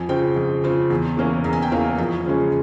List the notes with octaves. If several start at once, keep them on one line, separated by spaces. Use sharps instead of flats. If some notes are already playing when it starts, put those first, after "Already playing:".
Already playing: F2 G#5
C#3 F3 C4 G5
F2
C#3 F3 C4
E2
E3 A#3 C#4
E2 A#5
G#5
G5
E3 A#3 C#4 F5
F2 G#5
C#3 F3 G#3 C#4